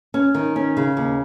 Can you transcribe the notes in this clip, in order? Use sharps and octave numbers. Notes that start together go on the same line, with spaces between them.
C#4
D#3
C#4
C#3
D#2